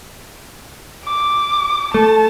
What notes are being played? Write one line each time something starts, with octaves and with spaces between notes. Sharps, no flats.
D6
A3 A5